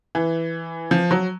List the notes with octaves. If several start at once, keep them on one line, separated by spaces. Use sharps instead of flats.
E3
F3
F#3